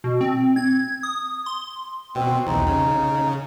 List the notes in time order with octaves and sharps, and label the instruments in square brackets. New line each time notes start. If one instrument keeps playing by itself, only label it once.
[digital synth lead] B2
C4
G#6
D#6
C6
[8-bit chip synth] B2 [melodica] C4
[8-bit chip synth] B1 E2 [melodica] D#4
[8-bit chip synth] C#3